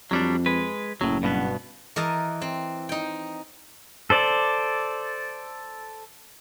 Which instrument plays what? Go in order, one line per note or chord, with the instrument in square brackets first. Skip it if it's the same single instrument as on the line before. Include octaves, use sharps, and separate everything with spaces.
[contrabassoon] F2 [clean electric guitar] F#3 G3 D4
[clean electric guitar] G#3 B4
[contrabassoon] F#1 [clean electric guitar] A2 F#3
[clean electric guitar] G2 B2 B3
[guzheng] E3 A#4 D#5 A5 A#5
C4
D#4 G5
[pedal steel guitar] A4 C5 D5